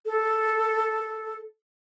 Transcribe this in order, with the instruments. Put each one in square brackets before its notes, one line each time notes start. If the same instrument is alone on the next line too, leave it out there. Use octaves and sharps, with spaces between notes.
[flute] A4